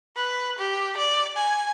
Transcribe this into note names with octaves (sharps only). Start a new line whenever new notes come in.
B4
G4
D5
G#5